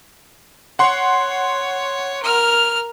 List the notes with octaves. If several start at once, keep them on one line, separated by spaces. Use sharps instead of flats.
C#5 F#5 C6
A#4 F6